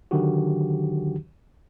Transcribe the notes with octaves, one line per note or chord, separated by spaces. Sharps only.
D3 D#3 F#3 D4 F#4 G4